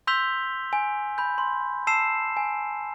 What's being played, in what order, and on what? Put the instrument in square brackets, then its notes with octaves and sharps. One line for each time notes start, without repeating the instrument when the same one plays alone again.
[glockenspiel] C6 E6 G6 B6 F7 G7
G#5
B5 G6
C6
A5 E6 C7 E7
G#5